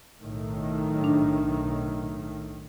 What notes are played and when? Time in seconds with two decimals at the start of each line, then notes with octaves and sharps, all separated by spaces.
0.20 B1 A2 D#3
1.04 D4